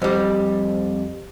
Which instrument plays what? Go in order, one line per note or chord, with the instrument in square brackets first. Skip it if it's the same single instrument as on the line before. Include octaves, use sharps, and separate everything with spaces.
[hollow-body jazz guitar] F2 G3